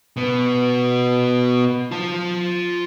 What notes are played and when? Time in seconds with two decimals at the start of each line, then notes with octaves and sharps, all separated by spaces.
0.17 B2 B3
1.91 F4 A5